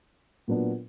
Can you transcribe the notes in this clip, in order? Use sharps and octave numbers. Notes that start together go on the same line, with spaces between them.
A#2 F#3 B3 D4 F4